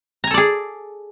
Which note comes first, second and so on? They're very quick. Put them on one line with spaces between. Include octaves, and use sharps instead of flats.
A#5 G#5 A4 D5 G#4